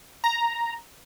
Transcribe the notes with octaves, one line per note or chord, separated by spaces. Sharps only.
A#5